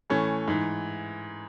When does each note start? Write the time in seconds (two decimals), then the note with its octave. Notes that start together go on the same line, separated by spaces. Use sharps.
0.10 A2 E3 A3 C#4
0.48 G#2 E3